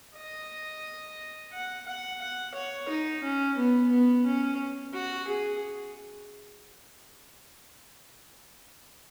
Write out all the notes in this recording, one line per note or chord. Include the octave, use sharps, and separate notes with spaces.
D#5
F#5
F#5
F#5
C#5
D#4
C#4
B3
B3
C#4
F#4
G#4